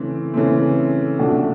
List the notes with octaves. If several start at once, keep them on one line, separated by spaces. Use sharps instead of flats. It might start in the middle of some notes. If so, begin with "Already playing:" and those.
Already playing: C#3 E3 A3 C4
C#3 E3 A3 C4
C3 F3 A3 D4 F#4